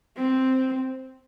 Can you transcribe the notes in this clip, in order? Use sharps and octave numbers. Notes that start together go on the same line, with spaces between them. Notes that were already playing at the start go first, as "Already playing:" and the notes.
C4